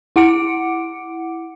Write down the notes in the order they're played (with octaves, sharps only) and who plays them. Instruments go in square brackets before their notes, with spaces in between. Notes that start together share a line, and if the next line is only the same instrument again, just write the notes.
[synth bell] E4 F#5 D6 C#7 D7